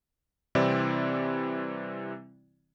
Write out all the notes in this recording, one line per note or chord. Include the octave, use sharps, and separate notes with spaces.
C3 E3 G3 C4 E4 D5